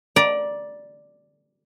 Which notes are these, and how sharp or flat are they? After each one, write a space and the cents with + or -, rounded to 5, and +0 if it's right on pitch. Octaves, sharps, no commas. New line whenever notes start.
D5 +0 A#5 +30